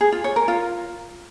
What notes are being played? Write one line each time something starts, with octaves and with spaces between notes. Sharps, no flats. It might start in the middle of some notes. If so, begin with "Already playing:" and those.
G#4
F4
C#5
A#4
F4